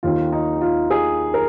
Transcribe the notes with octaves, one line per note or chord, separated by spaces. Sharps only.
D#2 D#3 F4
D#4
F4
G#4
A#4